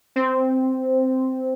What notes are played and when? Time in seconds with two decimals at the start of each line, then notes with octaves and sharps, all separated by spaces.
0.16 C4